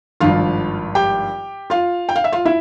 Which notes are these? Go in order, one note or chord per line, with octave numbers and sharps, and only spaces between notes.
G#1 G2 F3 F4 F5
G4 G5
F4 F5
G5
F5
E5
F4 F5
E4 E5